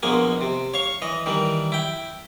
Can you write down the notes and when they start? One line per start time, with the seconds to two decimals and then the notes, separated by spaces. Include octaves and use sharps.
0.03 A#1 B2 G#3 A#3 G#5
0.41 C3
0.74 C#5 F5 C#6
1.02 E3 D#5
1.26 D#3 E3 G3
1.72 E4 G5